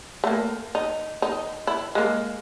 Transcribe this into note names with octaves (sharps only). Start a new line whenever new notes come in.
A3 A#3
D#4
D#4
E4
G#3 A#3